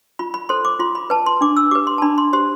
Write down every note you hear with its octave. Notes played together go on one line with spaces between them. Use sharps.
F4 B5
B5
A4 C5 C6
D6
F4 C6
B5
B4 A5
C6
D4 D6
E6
G4 B4 D6
C6
A5
D4 B5
C6
G4 C5 C6